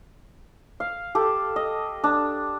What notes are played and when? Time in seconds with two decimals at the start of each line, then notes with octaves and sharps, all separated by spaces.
0.80 F5
1.15 G4 A4
1.56 D#5
2.04 D4